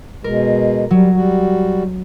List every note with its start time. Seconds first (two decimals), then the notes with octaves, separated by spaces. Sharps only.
0.24 B2 G#3 A#4
0.91 F#3 G3
1.15 G3 F#4